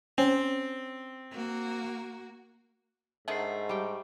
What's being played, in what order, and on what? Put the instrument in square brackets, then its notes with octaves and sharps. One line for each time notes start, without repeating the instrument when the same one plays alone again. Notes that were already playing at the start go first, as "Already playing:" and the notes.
[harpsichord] C4 [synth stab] C#4
[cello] A#3 F#4
[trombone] G#2 [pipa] D3 D#3 A3 [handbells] E5 C7
[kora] G3 G5